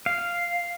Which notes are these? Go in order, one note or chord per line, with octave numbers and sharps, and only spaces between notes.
F5